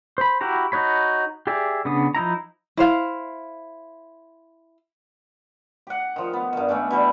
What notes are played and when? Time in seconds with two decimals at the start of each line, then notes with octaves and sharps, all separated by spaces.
0.18 C5 B5
0.41 E4 F#4 G4 A#5
0.72 D#4 F#4 C#5 B5
1.47 G4 G#4 D5 E5
1.85 C#3 B3 D4 D#6
2.15 F3 D#4 E4 A#5
2.77 E4 C5 F5
5.87 G4 F#5
6.16 D#3 F3
6.33 B3
6.53 G2 D#3
6.68 D#3 A3 C#4 D4
6.91 B2 E3 G3